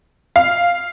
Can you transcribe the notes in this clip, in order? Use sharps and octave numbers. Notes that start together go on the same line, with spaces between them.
F5